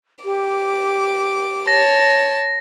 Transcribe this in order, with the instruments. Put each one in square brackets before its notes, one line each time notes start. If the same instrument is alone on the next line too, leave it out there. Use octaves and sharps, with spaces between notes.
[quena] G4 [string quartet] D6
[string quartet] C#5 A5 [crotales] A#6